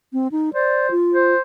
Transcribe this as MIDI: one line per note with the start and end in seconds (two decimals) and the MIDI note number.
0.13 0.28 60
0.32 0.50 63
0.53 0.91 72
0.53 0.90 74
0.91 1.34 65
1.14 1.39 72